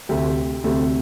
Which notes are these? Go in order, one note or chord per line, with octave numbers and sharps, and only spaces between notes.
D2 C3 A3 C4 G4
D2 C3 A3 C4